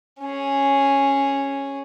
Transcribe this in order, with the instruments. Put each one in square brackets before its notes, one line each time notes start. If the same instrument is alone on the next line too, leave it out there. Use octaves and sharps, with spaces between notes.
[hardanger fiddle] C#4 G#4